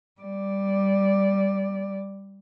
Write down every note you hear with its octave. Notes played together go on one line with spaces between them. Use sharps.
G3 D5